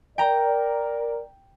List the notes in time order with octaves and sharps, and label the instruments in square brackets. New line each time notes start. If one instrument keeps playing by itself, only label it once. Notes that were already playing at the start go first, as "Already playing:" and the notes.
[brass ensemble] A#4 D5 [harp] G5 A#5